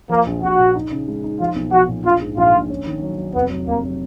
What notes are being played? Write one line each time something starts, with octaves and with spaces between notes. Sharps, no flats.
F3 A#3
A#1
A#1 F#4
A#2
D#4
C#3
G#3
D#4
F3 F4
B1
F3 F#4
A#2
A#1 F4
G#2
A#1 F4
A#1
C#4
D#3
F#3
F#3
F1 B3
F#3
F1 A#3
F#3